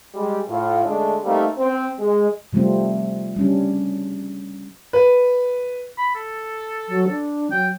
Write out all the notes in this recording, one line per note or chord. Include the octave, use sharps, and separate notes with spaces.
G3 G#3
A2 F4
D3 G#3 A3 D4
G3 A3 A#3 C4 D#4
C4
G#3
C3 F3 G3 A3 C4
G3 C#4 D4
B4
B5
A4
F#3
D4
F#3 G5